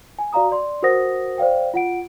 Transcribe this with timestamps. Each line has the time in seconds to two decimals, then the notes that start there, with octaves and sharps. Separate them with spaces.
0.19 G#5
0.33 F#4 D5 F5 A#5 D#6
0.52 D5 C6
0.82 F#4 A#4 C5 F#5 D#6 A#6
1.38 C5 D5 F5 G5
1.74 F4 F#5 D7